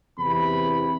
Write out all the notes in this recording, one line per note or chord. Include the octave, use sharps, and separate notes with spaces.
E2 C3 B5